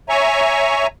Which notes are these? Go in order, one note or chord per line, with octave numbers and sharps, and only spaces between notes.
C#5 E5 G#5 A#5 C#6